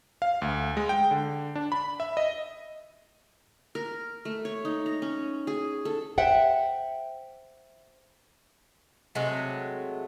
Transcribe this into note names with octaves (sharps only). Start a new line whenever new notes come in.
F5
D2
G#3
G5
D3
D4
B5
E5
D#5
A#4
A3
C#5
D#4
A#5
C#4
G#4
A4
C5 E5 F#5 G5
C3 F#3 G#3 A3